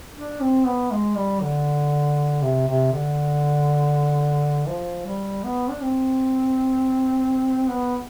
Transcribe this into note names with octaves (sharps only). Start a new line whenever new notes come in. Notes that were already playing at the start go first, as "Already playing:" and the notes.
D4
C4
B3
G#3
G3
D3
C3
C3
D3
F3
G3
B3
D4
C4
B3